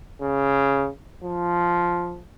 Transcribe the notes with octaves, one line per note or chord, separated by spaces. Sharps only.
C#3
F3